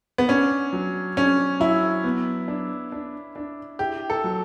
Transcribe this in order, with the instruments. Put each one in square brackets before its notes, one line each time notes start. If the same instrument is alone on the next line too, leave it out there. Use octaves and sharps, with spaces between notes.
[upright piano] B3
[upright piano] C#4 [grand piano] D4
[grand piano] F#3
[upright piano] C#4 [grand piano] D4
[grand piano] F#3 [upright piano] E4
[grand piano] B3
D4
D4
D4
[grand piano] E4 [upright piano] G4
[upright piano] A4
[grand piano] F#3